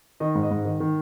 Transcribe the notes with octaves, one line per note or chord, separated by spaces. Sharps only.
D#3 D#5
G#2
D#5
G#2
D#3
D#3